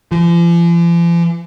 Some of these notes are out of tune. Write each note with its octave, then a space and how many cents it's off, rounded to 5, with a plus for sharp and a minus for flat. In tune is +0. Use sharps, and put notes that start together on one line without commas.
F3 -45